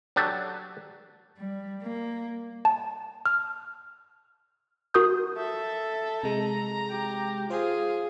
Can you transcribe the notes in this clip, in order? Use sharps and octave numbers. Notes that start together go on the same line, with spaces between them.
F#3 D4 G4 A4 A5
G3
A#3
A5
F6
F#4 A#4 D#6 G6
A4 E5
C3 G#3 A#5
G4
F4 G#4 C5